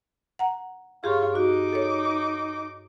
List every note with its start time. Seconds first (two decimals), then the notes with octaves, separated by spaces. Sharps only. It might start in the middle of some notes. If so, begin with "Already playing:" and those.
0.39 F#5 A#5
1.04 G2 F4 G4 G#4 C#5
1.35 D#4 F#4 D6
1.73 A4 C#5